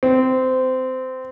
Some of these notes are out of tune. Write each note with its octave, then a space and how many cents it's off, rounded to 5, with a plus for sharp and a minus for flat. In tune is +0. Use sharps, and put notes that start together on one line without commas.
C4 -20